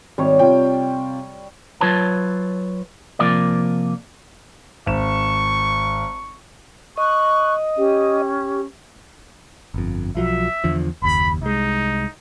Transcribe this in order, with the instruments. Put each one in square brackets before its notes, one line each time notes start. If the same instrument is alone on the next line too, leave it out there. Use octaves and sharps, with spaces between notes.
[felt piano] G#1 [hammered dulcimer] G3 C#5
[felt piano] C3 F4 G5
[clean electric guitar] F#3 F4 B4 C#5 A5
C3 F3 A#3 D5
[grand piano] G#1 E7 [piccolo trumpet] C#6
[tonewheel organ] D#5 [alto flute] C#6 [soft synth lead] F#6
[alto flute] C#4 [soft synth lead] G4
[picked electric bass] G1 F2
[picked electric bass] B1 F3 F#3 [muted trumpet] E5
[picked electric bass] E2 D3 F3
[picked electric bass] F#1 D#2 [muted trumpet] B5
[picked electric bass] C2 G#3 [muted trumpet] D#4